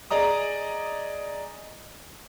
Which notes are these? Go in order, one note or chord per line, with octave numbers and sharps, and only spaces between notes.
G#4 D5 D#5 A#5 D#6